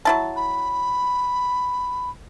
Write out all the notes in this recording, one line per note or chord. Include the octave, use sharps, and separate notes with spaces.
F#3 E4 A5
B5